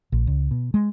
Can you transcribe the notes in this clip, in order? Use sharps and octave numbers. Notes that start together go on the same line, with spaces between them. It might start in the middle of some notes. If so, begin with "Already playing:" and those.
A#1
C#2
B2
G#3